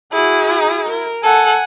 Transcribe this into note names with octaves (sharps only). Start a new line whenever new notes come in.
E4 F#4 G#4
A#4
A4 F#5 G#5